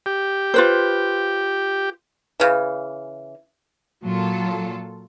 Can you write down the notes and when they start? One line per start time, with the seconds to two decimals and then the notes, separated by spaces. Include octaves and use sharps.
0.06 G4
0.54 F4 B4 C5
2.40 C#3 E3
4.04 A#2 F#3 F4 A4